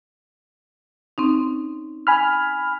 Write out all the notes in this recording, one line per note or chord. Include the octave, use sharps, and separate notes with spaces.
C4 C#4 D#4
G#5 B5 F6